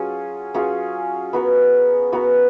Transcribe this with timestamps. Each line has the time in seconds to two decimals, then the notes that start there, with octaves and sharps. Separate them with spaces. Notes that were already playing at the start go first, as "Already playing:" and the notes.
Already playing: F#3 C#4 F4 G#4
0.54 F#3 C#4 F4 G#4
1.33 B3 F#4 A#4
2.12 B3 F#4 A#4